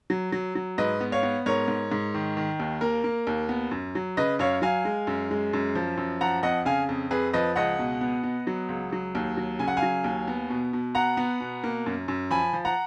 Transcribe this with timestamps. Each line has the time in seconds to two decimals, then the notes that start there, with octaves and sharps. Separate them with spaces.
0.10 F#3
0.32 F#3
0.55 F#3
0.78 G#2 B4 D#5
1.01 B3
1.12 C#5 F5
1.23 B3
1.46 G#2 A#4 C#5
1.68 G#2
1.92 G#2
2.14 D#3
2.37 D#3
2.60 D#2
2.81 A#3 A#4
3.04 A#3
3.27 D#2
3.49 B3
3.71 F#2
3.95 F#3
4.17 C#3 B4 D#5
4.39 F#2 C#5 F5
4.62 F#3 F5 G#5
4.85 G#3
5.07 F#2
5.31 G#3
5.53 F#2
5.75 F3
5.97 F#2
6.21 F3 F#5 A#5
6.43 F2 D#5 F#5
6.65 C#3 F5 G#5
6.89 F2
7.11 F2 G#4 B4
7.33 F3 B4 D#5
7.56 C#2 D#5 F#5
7.79 B2
8.01 B3
8.23 B3
8.47 F#3
8.69 C#2
8.92 F#3
9.15 D#2
9.37 F#3
9.59 C#3 G#5
9.68 F#5
9.77 F5 G#5
9.82 F#3
10.04 D#2
10.28 B3
10.50 B2
10.73 B2
10.95 B3 F#5 A#5
11.17 B3
11.40 B2
11.64 A#3
11.86 F#2
12.08 F#2
12.31 F3 G#5 B5
12.53 F3
12.65 F#5 A#5